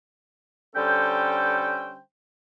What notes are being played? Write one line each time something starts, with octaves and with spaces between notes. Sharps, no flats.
D3 G3 C#4 A4 C5 G5